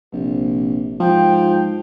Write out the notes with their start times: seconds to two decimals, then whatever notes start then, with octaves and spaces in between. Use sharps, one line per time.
0.13 A#1 C3
1.00 G#2 F3 G5